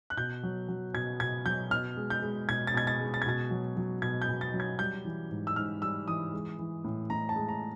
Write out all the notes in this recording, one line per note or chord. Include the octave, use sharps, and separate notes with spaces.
F#6
B2 G6
F#3
F#3
B2 G#6
B2 G#6
F#3 G6
B2 F6
G#3
G6
G#3
B2 G#6
A6
B2 G#6
A6
G#3
A6
G#6
B2 A6
F#3
F#3
B2 G#6
G6
B2
A6
F#3
G#6
G3 G6
E3
G#2
E6
G#2 F6
G3 E6
E3 D#6
G#3
E3
A2
A2 A#5
A5
G#3
A#5